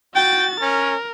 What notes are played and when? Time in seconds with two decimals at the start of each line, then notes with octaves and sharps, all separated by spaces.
0.14 F#4 G5 A6
0.61 C#4 A#4